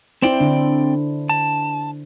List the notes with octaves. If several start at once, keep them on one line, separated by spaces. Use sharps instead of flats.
C4 E4 C5 D5 G5
D3 D4
A5